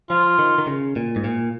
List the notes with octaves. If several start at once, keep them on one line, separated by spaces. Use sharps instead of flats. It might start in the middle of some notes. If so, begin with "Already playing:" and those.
F3 F4
D#3
D#3
C#3
A#2
G#2
A#2